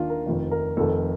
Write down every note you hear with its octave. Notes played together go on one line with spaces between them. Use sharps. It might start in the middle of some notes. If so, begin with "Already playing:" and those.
Already playing: D#2 D#3 D4 F4
A#4
F1 F2 D#3
A#4
F1 F2 D#3 A4